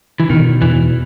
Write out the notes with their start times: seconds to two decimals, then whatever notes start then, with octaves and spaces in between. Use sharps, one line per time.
0.20 E3
0.30 B2 D#3
0.62 E2 E3